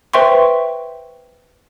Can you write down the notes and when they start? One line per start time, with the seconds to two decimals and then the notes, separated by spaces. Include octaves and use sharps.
0.13 B4 C5 E5 G5 C6 C#6